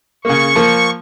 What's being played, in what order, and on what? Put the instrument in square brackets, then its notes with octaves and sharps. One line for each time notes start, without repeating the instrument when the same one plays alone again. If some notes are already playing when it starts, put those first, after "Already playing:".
[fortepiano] C#3 A#3 [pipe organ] C#6
[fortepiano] F3 A#3